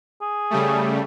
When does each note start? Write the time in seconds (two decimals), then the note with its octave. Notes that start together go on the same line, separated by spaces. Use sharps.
0.21 G#4
0.50 C#3 G3 A3